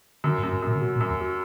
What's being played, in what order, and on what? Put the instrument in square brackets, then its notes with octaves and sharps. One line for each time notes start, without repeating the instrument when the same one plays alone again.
[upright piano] F#2 [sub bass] D3
[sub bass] G2
[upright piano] F#2
[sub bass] G2
[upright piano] F#2 [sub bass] A#2
[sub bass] C#3
[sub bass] B2 [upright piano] F#3
[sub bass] A#2
[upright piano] F#2
[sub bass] E2
[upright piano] F#3